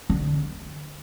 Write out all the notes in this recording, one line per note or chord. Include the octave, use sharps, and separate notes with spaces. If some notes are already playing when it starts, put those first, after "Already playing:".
D3